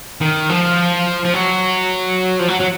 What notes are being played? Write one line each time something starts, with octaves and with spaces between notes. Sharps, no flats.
D#3
F3
F3
F#3
F3
F#3
F#3